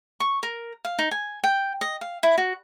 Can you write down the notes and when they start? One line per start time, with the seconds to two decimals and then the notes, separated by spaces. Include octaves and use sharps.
0.20 C#6
0.43 A#4
0.85 F5
0.99 D#4
1.11 G#5
1.44 G5
1.81 D#5
2.01 F5
2.23 E4
2.38 F#4